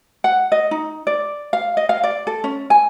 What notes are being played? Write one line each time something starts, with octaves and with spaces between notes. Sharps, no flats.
F#5
D#5
D#4
D5
F5
D#5
F5
D5
A4
C#4
G#5